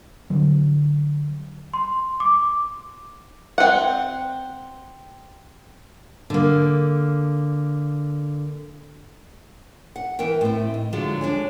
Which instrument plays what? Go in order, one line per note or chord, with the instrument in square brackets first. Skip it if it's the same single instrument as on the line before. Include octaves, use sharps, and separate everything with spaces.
[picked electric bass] D3 F#3
[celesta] C6
D6
[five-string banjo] C4 F#5
[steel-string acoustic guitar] D3 A#3
[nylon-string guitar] F#5
E3 B3 A#4 G5
A2 C4
D#4
D3 F3 F#3 G#3 D4
D4 C#5 G#5